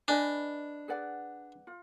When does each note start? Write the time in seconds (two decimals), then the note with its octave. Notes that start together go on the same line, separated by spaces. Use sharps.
0.08 D4 B4 D#5 G#5 B5
0.88 G#4 B4 D5 F#5
1.67 F4